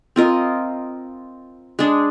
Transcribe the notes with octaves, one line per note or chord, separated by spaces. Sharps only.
C4 F4 A#4 D#5
G#3 D4 G#4